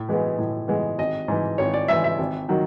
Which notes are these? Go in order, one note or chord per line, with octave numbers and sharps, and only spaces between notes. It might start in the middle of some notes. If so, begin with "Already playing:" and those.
Already playing: A2
E3 G#3 B3
A2
E3 G#3 B3
G#1 D#5
G#2 E3
G#1 C#5
D5
G#2 E3 E5
E5
G#1
D#3 F#3